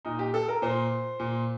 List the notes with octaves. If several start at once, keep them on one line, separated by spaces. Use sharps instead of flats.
A#2 D#4
G4
A4
A#4
A#2 C5
A#2